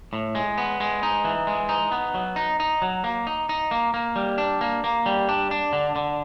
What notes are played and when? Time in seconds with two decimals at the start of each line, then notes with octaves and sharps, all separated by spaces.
0.13 A2
0.35 G#3
0.58 B3
0.80 G#3
1.03 D#4
1.25 E3
1.47 G#3
1.69 D#4
1.92 B3
2.14 F#3
2.36 D#4
2.60 D#4
2.82 F#3
3.04 A#3
3.27 D#4
3.49 D#4
3.71 A#3
3.94 A#3
4.16 G3
4.38 D4
4.61 A#3
4.84 A#3
5.06 G3
5.29 D4
5.51 D4
5.73 D3
5.96 D3